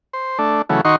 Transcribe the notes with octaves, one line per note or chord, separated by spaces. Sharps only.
C5
A3 D4
C#3 E3 F#3 A3
D#3 D#4 F#4 C6 C#6